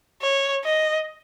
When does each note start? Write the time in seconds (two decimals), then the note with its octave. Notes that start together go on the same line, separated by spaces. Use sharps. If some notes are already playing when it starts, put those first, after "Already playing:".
0.21 C#5
0.65 D#5